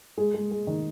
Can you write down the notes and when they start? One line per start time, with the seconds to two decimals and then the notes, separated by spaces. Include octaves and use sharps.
0.17 G#3 G#4
0.34 G#3
0.51 G#3
0.67 D#3